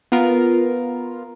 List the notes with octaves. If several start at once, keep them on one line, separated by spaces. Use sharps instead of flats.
B3 F4 A#4